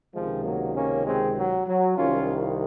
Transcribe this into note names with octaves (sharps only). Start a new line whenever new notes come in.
C#2 C3 D#3 F3 G#3
F#3 A#3
A#3 C#4
G#3 C4
F#3
F#3
C2 C3 D#3 C#4 F4